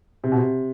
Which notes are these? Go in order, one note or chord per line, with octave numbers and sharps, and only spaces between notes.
C3
B2
C3